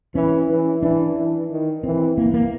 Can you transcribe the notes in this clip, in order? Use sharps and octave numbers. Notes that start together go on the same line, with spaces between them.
E3 C#4
E3
E3 D4
E3
D#3
E3 C4
E3 A#3
A#3